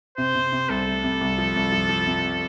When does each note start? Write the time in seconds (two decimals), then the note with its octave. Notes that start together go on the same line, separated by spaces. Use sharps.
0.18 C3 C5
0.35 C3
0.53 C3
0.69 C2 A4
0.87 A3
1.04 C3
1.21 C2
1.38 F3
1.56 C2
1.72 F3
1.89 F3
2.07 C3